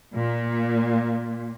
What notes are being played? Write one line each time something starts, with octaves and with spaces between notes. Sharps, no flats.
A#2